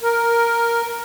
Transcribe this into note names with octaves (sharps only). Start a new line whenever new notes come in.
A#4